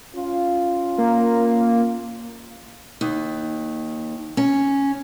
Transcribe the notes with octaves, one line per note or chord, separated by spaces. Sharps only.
C#4 F4
A#3
D#2
C#4